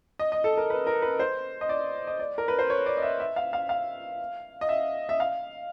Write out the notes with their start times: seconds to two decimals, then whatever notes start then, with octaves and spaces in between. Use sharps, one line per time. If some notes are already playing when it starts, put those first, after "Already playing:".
0.19 D#5
0.32 D#5
0.44 A4
0.57 A#4
0.70 B4
0.87 A#4
1.02 B4
1.20 C5
1.61 D#5
1.69 D5
2.07 D#5
2.19 D5
2.38 A#4
2.48 B4
2.59 C5
2.70 C#5
2.86 D5
2.97 D#5
3.02 E5
3.20 E5
3.36 F5
3.53 F5
3.69 F5
4.61 D#5
4.69 E5
5.09 E5
5.20 F5